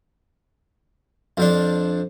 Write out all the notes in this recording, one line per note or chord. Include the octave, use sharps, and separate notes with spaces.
F2 F3 D4